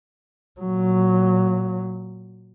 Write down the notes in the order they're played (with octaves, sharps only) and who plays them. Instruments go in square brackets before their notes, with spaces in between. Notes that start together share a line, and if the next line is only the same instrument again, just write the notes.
[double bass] A#2 F#3